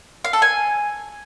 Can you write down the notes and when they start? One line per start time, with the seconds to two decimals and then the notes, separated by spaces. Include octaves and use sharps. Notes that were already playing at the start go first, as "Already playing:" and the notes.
0.25 F5
0.33 A4
0.42 G#5